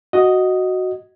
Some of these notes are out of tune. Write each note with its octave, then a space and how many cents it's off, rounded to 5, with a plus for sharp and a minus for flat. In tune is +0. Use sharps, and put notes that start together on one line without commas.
F#4 +0 D#5 +0